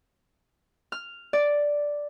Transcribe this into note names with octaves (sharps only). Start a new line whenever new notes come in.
F6
D5